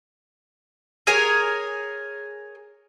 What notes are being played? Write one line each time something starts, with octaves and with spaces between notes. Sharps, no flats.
G#4 A#4 C#5 G#5